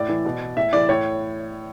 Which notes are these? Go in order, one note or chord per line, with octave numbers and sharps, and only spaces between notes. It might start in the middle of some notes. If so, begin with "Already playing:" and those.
Already playing: A2 D5
E3
B2
A2 E5
E3 D5
A2 C#5